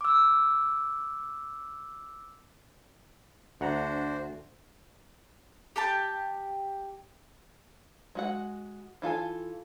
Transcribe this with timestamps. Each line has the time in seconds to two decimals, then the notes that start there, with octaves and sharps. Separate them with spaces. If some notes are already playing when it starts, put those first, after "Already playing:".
0.01 D6 E6
3.61 D2 D4 F#4 C5 F#5 A#5
5.76 G4 G5 A5
8.15 G#3 F#4 F#5
9.02 E3 F4 A4 G#5